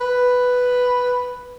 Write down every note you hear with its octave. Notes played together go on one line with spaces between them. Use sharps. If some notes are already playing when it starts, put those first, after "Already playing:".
B4